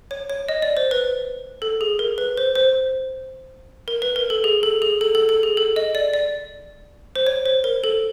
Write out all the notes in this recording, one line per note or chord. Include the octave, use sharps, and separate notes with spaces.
C#5
C#5
D#5
D5
C5
B4
A4
G#4
A#4
B4
C5
C5
A#4
B4
A#4
A4
G#4
A4
G#4
A4
A4
A4
G#4
A4
D#5
D5
D5
C5
C#5
C5
A#4
A4